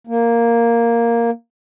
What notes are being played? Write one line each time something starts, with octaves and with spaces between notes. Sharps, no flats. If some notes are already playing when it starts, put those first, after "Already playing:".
A#3